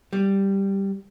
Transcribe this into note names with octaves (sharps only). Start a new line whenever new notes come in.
G3